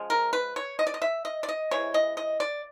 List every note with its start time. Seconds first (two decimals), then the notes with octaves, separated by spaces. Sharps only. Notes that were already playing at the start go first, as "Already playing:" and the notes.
Already playing: C#3 F3 G#3
0.10 A#4
0.33 B4
0.56 C#5
0.79 D#5
0.87 D5
0.94 D#5
1.02 E5
1.25 D#5
1.43 D5
1.49 D#5
1.71 C3 E3 G#3 C#5
1.94 D#5
2.17 D#5
2.40 D5